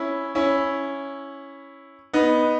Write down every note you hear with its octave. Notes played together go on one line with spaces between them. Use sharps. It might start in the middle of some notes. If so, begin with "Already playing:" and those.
Already playing: C#4 E4
C#4 E4
B3 D#4